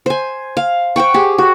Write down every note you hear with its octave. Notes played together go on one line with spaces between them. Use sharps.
C5 G#5
F5
C5 F#5 G5 C#6
G4 G#4
F#4